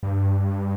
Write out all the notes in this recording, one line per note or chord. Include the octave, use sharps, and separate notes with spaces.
G2